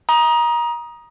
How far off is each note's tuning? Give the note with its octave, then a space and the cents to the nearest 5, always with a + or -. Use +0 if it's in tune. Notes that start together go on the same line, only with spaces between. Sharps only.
A#5 +25 D#6 +0